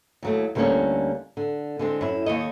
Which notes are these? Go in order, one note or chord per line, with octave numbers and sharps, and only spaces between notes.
D#2 F#3 A3
D2 D3 G3 A3 A#3 C#4
D3
D3 G#3 C4
F#2 E4
D#2 G#2 C#5 D#5